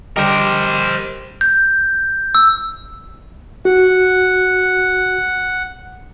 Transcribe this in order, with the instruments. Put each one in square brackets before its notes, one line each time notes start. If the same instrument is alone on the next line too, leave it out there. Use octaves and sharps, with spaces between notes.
[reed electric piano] D3 G3 D#5 [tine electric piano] G4 [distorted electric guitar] A#4 C5
[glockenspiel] G6
E6
[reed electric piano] F#4 [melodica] F#5